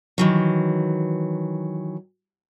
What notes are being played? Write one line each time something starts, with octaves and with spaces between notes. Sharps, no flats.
D#3 E3 F#3